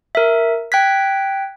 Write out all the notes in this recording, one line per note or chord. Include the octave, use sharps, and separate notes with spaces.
A#4 E5
G5 F#6 G#6 B6